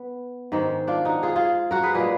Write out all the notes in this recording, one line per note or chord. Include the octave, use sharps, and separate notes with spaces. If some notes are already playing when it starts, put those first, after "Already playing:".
Already playing: B3
G#2 D#3 G#3
D4 F4
D#4 F#4
F4 G#4
F4 G#4
F#4 A#4
G#4 B4
A#2 G#3 G#4 B4